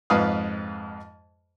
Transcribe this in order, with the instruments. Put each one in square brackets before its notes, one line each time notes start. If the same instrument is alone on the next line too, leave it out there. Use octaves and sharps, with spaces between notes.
[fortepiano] F2 G#2 B4 F5 D#6